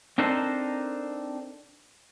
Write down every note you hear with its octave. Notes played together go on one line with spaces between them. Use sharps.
C4 D4 D#4 A4 A#4 C5